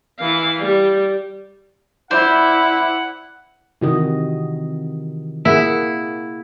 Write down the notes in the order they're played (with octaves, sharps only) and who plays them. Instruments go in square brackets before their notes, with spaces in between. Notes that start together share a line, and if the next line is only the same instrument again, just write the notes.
[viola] E3 F5
G3
[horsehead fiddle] E4 [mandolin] C5 D5 [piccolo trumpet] F#5
[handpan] C3 F#4 D#5 [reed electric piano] D#3 E3
[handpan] A#3 G#4 F#5 [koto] E4